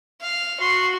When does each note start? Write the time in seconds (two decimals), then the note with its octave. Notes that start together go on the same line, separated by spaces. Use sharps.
0.21 F5
0.61 F#4 C6